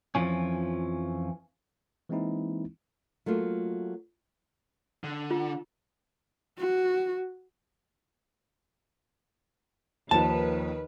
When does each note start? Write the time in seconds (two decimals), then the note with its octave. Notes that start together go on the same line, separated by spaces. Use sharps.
0.15 F2 E3 F3 C#4
2.09 E3 G#3 A#3 C4 D#4 E4
3.26 F#3 A3 A#3 F4
5.04 D3
5.31 F4
6.58 F#4
10.11 D#2 D#3 F3 B4 A5 E7